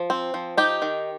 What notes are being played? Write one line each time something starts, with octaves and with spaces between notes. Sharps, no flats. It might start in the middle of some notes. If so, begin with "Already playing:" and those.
Already playing: F3
C4
F3
D#4 G4
D#3